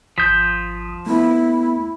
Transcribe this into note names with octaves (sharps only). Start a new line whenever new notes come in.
G#1 F3 D#6 G6 B6
A3 B3 E4